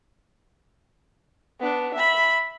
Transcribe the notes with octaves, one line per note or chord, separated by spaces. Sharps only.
B3 D4
E5 B5